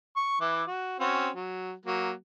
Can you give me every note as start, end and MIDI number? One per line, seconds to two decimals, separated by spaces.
0.16 0.37 85
0.40 0.63 52
0.40 0.63 64
0.40 0.63 86
0.67 0.98 66
1.00 1.29 60
1.00 1.29 61
1.00 1.29 66
1.35 1.73 54
1.86 2.12 54
1.86 2.12 58